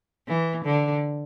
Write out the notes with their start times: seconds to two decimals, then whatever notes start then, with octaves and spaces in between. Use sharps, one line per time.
0.28 E3
0.65 D3